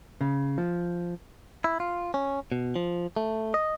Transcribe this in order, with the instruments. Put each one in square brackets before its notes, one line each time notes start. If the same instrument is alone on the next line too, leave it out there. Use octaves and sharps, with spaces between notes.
[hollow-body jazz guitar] C#3
F3
[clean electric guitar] E4
F4
C#4
B2
F3
A3
D#5